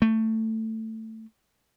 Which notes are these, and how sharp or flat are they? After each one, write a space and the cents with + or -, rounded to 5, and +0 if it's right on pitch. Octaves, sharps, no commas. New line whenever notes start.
A3 +15